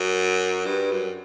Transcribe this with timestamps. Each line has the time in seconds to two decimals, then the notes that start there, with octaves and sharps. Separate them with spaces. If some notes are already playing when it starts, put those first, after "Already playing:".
Already playing: F#2
0.65 G2
0.91 F#2